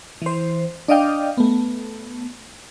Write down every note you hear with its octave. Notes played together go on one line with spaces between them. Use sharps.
E3 C5
D4 D5 D#5 F5 G5
A3 B3